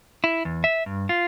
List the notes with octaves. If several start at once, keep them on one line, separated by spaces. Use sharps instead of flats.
E4
E2
E5
G2
F4